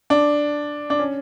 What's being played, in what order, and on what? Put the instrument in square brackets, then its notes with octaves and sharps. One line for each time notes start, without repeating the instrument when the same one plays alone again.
[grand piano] D4
D4
C#4